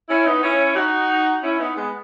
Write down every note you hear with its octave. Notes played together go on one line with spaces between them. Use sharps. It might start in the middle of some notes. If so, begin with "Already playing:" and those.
C#4 E4
B3 D#4
C#4 E4
D#4 F#4
C#4 E4
B3 D#4
G#3 B3